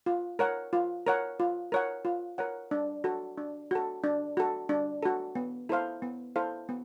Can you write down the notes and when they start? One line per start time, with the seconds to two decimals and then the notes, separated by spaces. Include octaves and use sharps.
0.06 F4
0.39 A#4 C#5 F#5
0.73 F4
1.07 A#4 C#5 F#5
1.40 F4
1.72 A#4 C#5 F#5
2.05 F4
2.38 A#4 C#5 F#5
2.71 D4
3.04 F#4 A4
3.38 D4
3.71 F#4 A4
4.04 D4
4.37 F#4 A4
4.69 D4
5.03 F#4 A4
5.35 B3
5.69 E4 A4 C5 F5
6.02 B3
6.36 E4 A4 C5 F5
6.69 B3